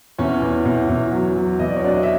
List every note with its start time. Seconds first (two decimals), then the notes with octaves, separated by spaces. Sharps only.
0.18 E2 C#4 C#5
0.42 E2
0.65 E2
0.89 E2
1.12 F#3
1.36 F#3
1.59 E2 D#5
1.68 D5
1.76 C#5
1.83 F#3 D4 D5
1.95 D#5
2.03 E5